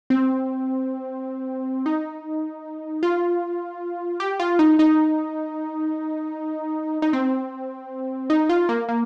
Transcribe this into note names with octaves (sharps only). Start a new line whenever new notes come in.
C4
D#4
F4
G4
F4
D#4
D#4
D#4
C4
D#4
F4
A#3
A#3